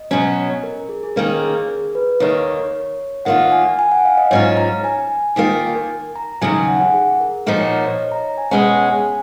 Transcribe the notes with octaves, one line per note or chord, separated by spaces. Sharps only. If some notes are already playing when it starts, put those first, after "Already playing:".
Already playing: D#5
B2 F#3 C#4
A#4
A#4
G#4
G#4
D#3 A#3 C#4 A#4
G#4
A#4
B4
D#2 D#3 A#3 C#5
D#3 A#3 F4 F#5
G#5
G#5
F#5
F5
D#5
G#2 F#3 C#4 F4 C#5
A#5
G#5
D#2 D#3 A#3 F4
A#5
D#2 C#3 F#3 G#5
G#5
F#5
F#5
G#4
A#4
A#2 F3 A#3 D#4 F#4 A#4
C#5
C#5
D#5
A#5
G#5
B2 G#3 C#4 F#5
G#5